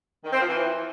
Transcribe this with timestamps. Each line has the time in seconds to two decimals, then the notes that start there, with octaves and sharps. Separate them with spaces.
0.24 D#3
0.32 C4
0.40 F3
0.48 E3